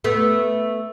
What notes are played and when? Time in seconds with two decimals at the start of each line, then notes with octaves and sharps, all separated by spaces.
0.04 A3 B3